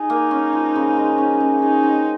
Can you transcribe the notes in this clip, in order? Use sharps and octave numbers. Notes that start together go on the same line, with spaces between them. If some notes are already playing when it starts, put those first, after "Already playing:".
Already playing: D#4 G#4
A#3
C#4
F3
C#3
G#3
C#4
C#3
D#4 G#4
C4